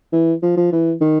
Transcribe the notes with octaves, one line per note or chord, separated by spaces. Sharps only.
E3
F3
F3
E3
D#3